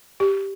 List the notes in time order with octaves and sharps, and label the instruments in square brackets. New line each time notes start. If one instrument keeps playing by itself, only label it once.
[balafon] G4